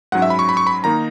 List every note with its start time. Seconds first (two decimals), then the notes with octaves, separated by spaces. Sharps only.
0.12 G#2 F#3 C#4 F#5
0.22 E5
0.30 B5
0.39 C#6
0.49 B5
0.57 C#6
0.67 B5
0.84 D#3 A#3 D#4 A#5